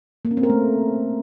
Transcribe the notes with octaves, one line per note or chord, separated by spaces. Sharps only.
A#3
C#4
C4
A#4
A3